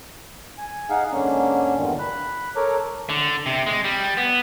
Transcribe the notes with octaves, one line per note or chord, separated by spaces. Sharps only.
G#5
D#4 G#4 F5 F#5
G#2 D3 A#3 C#4 D4
E2 G2 A#2 D3 D#3
B5 F#6
A4 A#4 C#5 A#5 D6
D3
C3
G#3
G3
B3